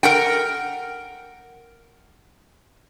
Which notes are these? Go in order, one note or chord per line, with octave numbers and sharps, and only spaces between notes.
A#4 F#5 G5